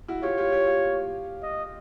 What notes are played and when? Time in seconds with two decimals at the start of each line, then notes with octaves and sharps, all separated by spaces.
0.08 E4 F#4
0.23 F4 G4 C#5
0.38 F4 G4
0.52 F4 G4
0.67 F4 G4
1.42 D#5